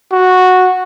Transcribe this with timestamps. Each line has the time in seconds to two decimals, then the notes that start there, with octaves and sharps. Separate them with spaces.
0.12 F#4